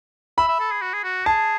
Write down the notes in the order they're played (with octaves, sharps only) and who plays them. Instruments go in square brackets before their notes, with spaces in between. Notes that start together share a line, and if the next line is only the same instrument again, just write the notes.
[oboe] E5 [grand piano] B5
[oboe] E5
A4
G#4
F#4
G#4
F#4
[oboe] G#4 [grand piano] A5